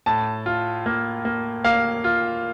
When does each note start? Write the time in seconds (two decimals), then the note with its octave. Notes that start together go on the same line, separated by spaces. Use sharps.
0.06 A2 A5
0.46 F4
0.86 A#3
1.25 A#3
1.64 A#3 F5
2.04 F4